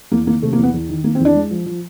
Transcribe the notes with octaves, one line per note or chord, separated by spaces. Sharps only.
E2 A#3
D#3 A#3
C3 A3
A#3
E2
B3
E2
D#3
D#3 A#3
C4
E2
D4
G#3
F3
F3